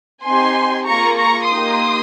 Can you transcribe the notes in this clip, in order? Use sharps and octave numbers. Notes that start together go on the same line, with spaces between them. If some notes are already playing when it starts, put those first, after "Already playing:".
C4 D#4 G4 G#5 C6
A#3 F4 G#4 A#5 C#6
A#5 C#6
A#3 D#4 G4 C6 D#6